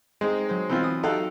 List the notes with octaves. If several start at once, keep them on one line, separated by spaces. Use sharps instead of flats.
G#3 C4 D#4 C5
F#3 C5
E3 C4 F4
D#6
C4 D#4 F#4 G4 A4 F5 F#6